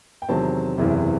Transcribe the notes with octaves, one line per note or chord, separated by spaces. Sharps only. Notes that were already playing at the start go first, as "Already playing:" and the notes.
G5
E2 C3 D#3 F#3 C4 A5
F#1 E2 C3 E3